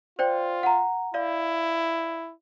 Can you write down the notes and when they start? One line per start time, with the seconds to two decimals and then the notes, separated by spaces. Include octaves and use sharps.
0.19 F4 C5 D5 G5
0.63 F#5 A#5
1.14 E4 D5 F5